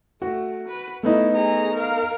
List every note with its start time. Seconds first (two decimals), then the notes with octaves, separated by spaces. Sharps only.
0.22 A3 F#4
0.68 B4
1.03 A3 B3 D#4 E4
1.35 G#4 A#5
1.75 A#4 F5